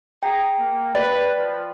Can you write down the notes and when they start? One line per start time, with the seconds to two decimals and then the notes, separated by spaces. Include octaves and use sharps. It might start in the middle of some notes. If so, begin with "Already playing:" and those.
0.23 G#4 G5 A#5
0.60 A#3
0.95 B4 D5
1.39 F3